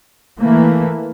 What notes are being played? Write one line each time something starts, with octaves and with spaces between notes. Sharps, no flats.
E3 A3 A#3